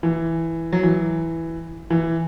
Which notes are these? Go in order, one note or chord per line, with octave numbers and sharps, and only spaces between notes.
E3
F#3
E3
E3